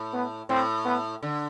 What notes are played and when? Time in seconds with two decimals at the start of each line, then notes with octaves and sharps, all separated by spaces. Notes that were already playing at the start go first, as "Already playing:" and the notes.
Already playing: A2
0.13 B3
0.49 A2 C4
0.85 B3
1.23 D3